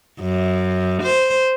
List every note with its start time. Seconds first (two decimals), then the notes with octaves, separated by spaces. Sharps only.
0.20 F#2
1.03 C5